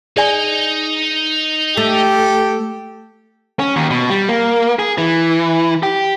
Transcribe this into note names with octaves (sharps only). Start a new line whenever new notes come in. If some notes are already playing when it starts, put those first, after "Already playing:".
D#4 G#4 D5 D#5 G#5
A3 G4 A4
C#4
D#2
B2
G3
A#3
G#4
E3
G4